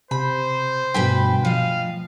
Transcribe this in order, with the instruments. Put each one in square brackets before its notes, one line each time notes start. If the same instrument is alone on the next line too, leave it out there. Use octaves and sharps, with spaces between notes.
[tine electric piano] C3 [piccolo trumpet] C5 [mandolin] B5
[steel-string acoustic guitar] D2 G2 B4 [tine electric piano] B2 A3 G#5 [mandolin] G5 B5
[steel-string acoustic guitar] F3 D#5 [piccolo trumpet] F5